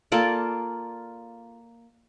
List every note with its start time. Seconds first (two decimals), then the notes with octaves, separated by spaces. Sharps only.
0.12 A#3 F4 A4 D5